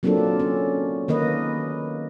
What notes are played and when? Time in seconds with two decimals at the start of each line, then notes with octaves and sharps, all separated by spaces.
0.03 F#3 A#3 C4 D4 F4 A4
0.40 C#4
1.08 D#3 A#3 B4 D#5